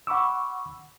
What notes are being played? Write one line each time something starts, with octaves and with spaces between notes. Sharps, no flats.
F#5 B5 C#6 D6 E6